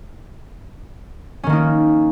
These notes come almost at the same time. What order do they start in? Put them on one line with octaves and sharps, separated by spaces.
C#4 D#3 A#3 D#4